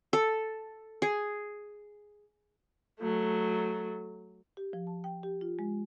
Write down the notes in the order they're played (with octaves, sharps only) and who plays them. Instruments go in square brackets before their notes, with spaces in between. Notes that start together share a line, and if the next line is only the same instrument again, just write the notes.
[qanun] A4
G#4
[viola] F#3 A3
[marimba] G4
F3
A5
G5
G4
F4
G#3